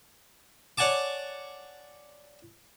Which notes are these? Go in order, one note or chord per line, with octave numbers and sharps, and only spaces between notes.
C#5 D5 F#5 G#5 A5 D6